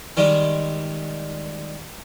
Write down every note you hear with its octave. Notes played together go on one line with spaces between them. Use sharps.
D#3 G3 G#3